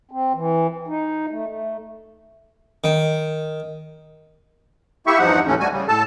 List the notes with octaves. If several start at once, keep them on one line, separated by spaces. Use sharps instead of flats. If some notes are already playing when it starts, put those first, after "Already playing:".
C4
E3
D#4
A3
A3
D#3
A#3 E4 G4 E5 C#6
E2 G2 F3 D#4 F#5
D#2 A2 E3 A3 C#4
D2 G3 A3 F#4 G#5
C#3 G3
A2 A4 A5